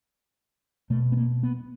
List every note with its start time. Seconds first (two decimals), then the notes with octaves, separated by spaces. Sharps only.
0.90 B2 A3
1.12 B3
1.17 A#3
1.43 B3